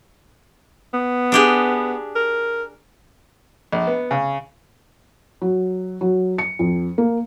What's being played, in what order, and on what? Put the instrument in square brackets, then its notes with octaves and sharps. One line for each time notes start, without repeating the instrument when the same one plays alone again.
[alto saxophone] B3
[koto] D4 G4 G#4
[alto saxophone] A#4
[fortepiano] A#1
B3
C#3
[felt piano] F#3
F#3
C#7
F2
A#3